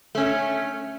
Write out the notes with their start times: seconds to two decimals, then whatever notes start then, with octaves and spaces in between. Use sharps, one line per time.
0.15 A3 C#4